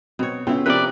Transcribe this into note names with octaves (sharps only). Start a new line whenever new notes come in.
B2 F#3 B3 C4 C#5
C#3 B3 C#4 E4 F4 G5
C3 F3 C4 A#4 B4 D5